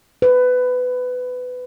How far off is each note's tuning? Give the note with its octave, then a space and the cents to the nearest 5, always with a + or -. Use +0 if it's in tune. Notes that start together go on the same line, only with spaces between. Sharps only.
B4 +20